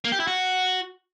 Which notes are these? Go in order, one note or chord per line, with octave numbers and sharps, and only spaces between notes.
A#3
G4
E4
F#4